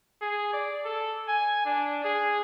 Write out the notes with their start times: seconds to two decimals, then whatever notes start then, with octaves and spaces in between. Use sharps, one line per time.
0.22 G#4
0.53 D5
0.85 A4
1.28 G#5
1.66 D4
2.04 G#4